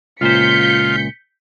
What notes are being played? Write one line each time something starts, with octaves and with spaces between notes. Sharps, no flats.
C#2 A#2 F4 C5 G6 B6 C#7